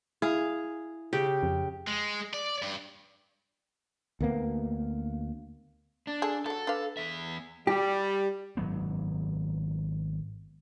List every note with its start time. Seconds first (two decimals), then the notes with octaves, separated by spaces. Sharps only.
0.22 E4 G#4 F5
1.13 C#3 G4
1.43 F2
1.87 G#3
2.33 D5
2.62 G2
4.20 D2 A#3 B3
6.07 D4
6.22 G#4 A4
6.46 E3 F#3 A4
6.67 D4 B4 F5
6.97 E2 E5
7.67 G3 G4
8.57 G#1 F#3 B3